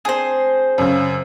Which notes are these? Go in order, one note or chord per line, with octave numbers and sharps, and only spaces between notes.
C4 D4 G#4 C5
F#2 C#3